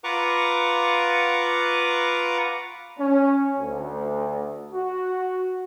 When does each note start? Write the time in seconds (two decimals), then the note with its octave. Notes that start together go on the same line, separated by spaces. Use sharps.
0.04 F4 B4 F#5 A#5 C#6 D6
2.98 C#4
3.60 D2
4.72 F#4